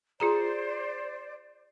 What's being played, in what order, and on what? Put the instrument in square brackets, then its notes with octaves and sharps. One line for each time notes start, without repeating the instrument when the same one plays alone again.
[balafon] F4 G#4 A#5 [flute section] C5 D5